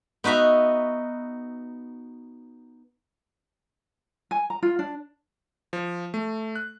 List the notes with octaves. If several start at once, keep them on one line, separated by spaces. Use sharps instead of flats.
B3 D#4 F#4 E5 A#5
G#5
A#5
F4
D4
F3
A3
F#6